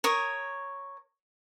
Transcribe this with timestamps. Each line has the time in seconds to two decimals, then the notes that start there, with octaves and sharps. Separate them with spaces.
0.04 A#4 C#5 D#6